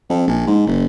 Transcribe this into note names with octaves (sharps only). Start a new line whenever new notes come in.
F2
A#1
G#2
F#1